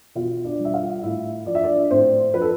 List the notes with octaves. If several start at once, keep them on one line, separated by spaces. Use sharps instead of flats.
B2 F4
D4 D5
G3
E5
F4 F5
A2 E4 E5
F3 D5
E5
D4 D5
A2 C4 C5
F3 B4
A4